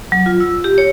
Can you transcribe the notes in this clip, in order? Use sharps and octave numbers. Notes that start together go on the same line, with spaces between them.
F#3
F4
E6
G4
C#5